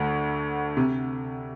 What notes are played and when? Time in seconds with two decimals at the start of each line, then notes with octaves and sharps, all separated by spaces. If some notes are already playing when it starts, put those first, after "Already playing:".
Already playing: D2 D3
0.77 C3